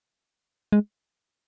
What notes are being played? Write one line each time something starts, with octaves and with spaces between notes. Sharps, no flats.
G#3